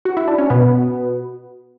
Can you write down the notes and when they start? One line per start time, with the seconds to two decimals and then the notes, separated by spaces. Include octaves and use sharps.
0.05 F#4
0.17 E4
0.28 D4
0.38 C#4
0.50 B2 B3